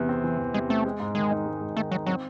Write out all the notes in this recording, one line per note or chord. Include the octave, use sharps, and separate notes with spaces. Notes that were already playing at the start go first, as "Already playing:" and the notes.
Already playing: E2 C3 E3
C4
E3
E2
C3 G#3
A3 C4
G#3
G#2
D#3 G#3
D#4
G#3
G#2
D#3 A3
F#3 D#4
F#3 C4